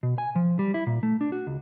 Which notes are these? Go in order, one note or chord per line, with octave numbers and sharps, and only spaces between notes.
B2
G#5
F3
G3
E4
A#2
A3
D4
F#4
C#2